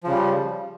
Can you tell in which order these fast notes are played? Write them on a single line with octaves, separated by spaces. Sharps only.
F3 C#3 G3